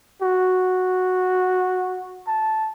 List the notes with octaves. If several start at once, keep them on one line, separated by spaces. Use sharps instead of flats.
F#4
A5